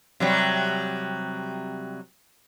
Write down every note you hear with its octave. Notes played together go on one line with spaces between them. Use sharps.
C3 F#3 G3